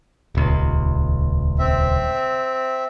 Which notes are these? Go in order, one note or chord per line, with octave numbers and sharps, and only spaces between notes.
D#1 C#2
C4 E5